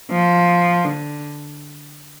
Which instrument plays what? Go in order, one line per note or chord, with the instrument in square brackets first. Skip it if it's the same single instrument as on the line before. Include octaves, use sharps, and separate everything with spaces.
[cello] F3
D3